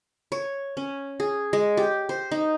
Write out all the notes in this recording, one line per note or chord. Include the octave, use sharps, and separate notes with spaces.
C#5
C#4
G#4
G#3
G4
C5
D#4